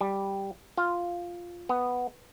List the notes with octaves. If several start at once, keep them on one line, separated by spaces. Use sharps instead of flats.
G3
F4
B3